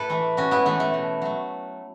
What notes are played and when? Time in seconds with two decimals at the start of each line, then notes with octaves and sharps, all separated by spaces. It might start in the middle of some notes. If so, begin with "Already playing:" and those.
Already playing: A2 E4 A4 B4
0.09 E3 A3
0.37 A2 C#4 F#4
0.51 B3 E4
0.65 E3 A3 B3
0.80 A3
0.94 B2
1.22 F#3 A3